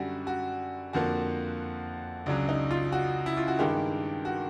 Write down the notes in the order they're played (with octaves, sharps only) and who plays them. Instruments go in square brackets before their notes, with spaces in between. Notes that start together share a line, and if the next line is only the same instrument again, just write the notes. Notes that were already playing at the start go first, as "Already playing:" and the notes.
Already playing: [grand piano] F#2 D3 G3 F#4
F#4
F2 D3 F3 A#3 F#4
C#2 C#3 F#3 D4
D#4
F4
F#4
E4
F4
F#4
G2 D#3 G#3 G4
F#4